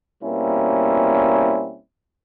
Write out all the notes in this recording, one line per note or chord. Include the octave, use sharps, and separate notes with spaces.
B2 G3 A#3 C4 C#4 E4